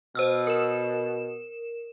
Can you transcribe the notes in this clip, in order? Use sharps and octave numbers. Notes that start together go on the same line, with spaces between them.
B2 C5 E6 F6
A#4 E7